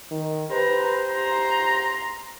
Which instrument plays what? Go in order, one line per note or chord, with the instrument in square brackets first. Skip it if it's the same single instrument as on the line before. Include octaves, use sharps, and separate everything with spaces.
[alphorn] D#3
[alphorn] G4 [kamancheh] B4 A#5 [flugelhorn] C5
[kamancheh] A#5 C6